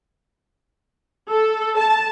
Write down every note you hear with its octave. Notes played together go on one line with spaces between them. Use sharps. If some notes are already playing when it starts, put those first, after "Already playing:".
A4
A5